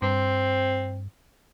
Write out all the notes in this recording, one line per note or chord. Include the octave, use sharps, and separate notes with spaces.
G2 C4